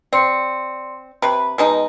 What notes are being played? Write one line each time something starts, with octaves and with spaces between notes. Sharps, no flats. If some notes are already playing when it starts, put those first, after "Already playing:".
C4 D5 C6 C#7
C3 B4 B5
B2 G#3 D#4 B4 A#5